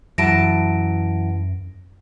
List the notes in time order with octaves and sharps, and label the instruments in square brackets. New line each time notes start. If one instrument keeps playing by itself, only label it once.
[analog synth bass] F#2 [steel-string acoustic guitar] E3 F#3 A5 [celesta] A#6 D7